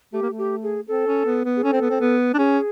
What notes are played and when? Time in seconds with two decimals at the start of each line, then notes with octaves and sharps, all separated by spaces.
0.13 A3 G4
0.22 A#3
0.30 A3
0.38 G4
0.63 G#4
0.88 C4 A4
1.07 C#4
1.25 B3
1.44 B3
1.56 G#4
1.63 C#4 A4
1.72 C4
1.81 B3
1.90 C4
2.01 B3
2.34 D4
2.38 C#4 G#4